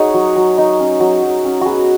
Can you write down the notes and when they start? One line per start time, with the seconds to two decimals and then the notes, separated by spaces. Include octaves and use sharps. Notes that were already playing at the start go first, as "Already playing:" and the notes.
Already playing: D#4 F#4 G#4 C#5
0.14 F#3
0.36 F#3
0.58 D#4
0.80 C#4
1.00 F#3
1.22 F#3
1.45 C#4
1.61 B3 F#4 G#4